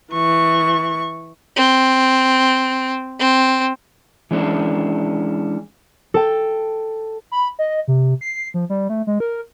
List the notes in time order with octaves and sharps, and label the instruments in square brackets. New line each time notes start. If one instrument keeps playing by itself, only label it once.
[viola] E3 C#6
[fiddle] C4
C4
[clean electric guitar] E3 G#3 C#4 D4
[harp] A4 G5
[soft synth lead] B5
D#5
C3
C7
F3
G3
A3
G#3
A#4